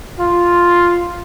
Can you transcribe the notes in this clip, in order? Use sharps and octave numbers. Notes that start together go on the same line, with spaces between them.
F4